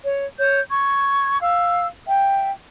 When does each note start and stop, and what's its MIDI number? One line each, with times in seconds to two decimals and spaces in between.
0.03 0.26 73
0.38 0.60 73
0.38 0.60 91
0.70 1.39 85
0.70 1.39 92
1.40 1.86 77
1.40 1.86 88
2.06 2.50 76
2.06 2.50 79